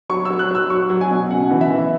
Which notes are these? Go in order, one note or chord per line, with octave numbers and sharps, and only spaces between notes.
F#3 C#6
F#3 E6
F#6
F#3 E6
F#3 C#6
F#3
G#5
B2
C#3 F#5
E3
E5
E3